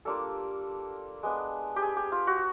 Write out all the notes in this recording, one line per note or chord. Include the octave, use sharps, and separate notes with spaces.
G3 A#3 D4 F4 A4
G#3 B3 D4
G4
G#4
G4
F4
F#4